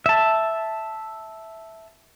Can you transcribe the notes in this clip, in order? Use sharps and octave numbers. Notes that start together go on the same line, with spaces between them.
E5 A5